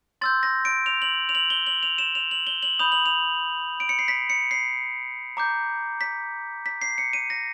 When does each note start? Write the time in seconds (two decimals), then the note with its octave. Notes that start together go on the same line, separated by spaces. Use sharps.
0.21 C6 E6 G6 A6
0.43 A#6
0.65 D7
0.86 F7
1.02 F#7
1.29 F7
1.35 F#7
1.50 G7
1.66 F#7
1.83 F7
1.98 E7
2.15 F7
2.31 F#7
2.47 G7
2.63 F#7
2.79 B5 D#6 G6 F7
2.92 F#7
3.06 F7
3.80 D7
3.89 C#7
3.99 C7
4.08 B6
4.30 C#7
4.51 C7
5.37 A#5 D6 G6
6.01 B6
6.66 B6
6.82 C7
6.98 C#7
7.13 D#7
7.30 A#6